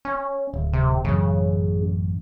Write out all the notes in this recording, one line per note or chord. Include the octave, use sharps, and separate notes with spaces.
C#4
D1
C3
A1 F#2 C#3